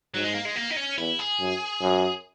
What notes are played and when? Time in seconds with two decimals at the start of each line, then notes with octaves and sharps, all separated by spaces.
0.14 G#2 F#3
0.24 G#3
0.35 A#3
0.45 G#3
0.56 A#3
0.71 D#4
0.77 C#4
0.98 E2 E4
1.19 G#4
1.40 F#2
1.81 F#2